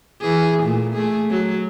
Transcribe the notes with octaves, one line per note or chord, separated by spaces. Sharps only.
E3 G#4
A#2 A3
A3 G#4
F#3